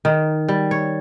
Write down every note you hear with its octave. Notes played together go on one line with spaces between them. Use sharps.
D#3
G3
C#5